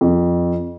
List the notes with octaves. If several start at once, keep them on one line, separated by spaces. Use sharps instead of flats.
F2